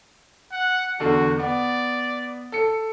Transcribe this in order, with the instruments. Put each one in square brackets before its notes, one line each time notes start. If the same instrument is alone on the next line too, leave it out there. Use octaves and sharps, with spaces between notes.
[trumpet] F#5
[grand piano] E2 D3 [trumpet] F#4
[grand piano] B3 [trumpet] D5
[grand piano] A4 C#7